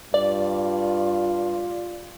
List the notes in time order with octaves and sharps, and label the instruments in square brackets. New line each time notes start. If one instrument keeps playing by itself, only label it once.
[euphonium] G2 [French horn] F4 [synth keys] D5